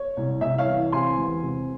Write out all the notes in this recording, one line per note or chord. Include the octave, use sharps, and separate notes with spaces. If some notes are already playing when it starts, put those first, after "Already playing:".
Already playing: C#5
C2
C2 E5
C#5 F5
E3
C3 G#5 C6
E2
C3